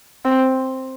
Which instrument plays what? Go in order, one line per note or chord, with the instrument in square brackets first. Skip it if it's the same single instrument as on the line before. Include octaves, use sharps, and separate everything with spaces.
[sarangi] C4